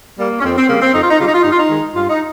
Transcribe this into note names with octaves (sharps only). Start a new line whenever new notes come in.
G3 A#3
C#4
F2 C4
C4
C#3 G3 A#3
C4
F2 D#4
F4
D#4
C#3 G3 F4
D#4
F4
G2 D#4
F4
D#4
D#3 G#3
G2 F4
D#4